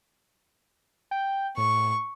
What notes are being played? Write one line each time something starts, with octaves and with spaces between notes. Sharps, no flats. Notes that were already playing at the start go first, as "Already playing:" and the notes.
G5
A2 C#6